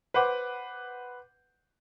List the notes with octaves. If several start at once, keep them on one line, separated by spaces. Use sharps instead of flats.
B4 C5 F#5 D6